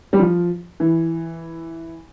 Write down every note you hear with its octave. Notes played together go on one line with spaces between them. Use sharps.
G3
F3
E3